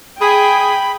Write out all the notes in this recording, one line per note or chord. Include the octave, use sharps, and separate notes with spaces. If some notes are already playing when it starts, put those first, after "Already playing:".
G#4 G5 B5